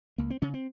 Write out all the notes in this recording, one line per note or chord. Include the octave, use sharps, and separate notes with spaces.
C#2 A#3
C4
C#3 C#4
C4